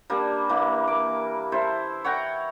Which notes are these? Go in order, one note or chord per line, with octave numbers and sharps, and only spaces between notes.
G3 A#3 D4
E3 A#3
D6
E4 A4 C5
C#5 F#5 G5 A#5